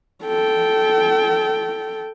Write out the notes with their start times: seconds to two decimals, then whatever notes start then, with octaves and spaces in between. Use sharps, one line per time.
0.24 A4 G5